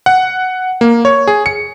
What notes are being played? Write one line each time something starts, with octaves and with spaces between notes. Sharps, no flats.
F#5
A#3
C#5
G#4
C#7